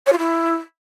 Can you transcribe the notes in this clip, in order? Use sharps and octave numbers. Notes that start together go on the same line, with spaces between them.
C#5
F4
E4